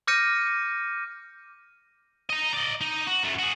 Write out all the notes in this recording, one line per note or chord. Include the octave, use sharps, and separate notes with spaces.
D6 F6 G6 A#6 C#7 D#7
D#5 A#5
D5 D#5
D#4
F#4
F#2 A3
F#4 G#4